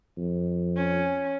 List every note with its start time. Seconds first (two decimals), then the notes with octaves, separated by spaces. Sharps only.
0.17 F2
0.77 C#4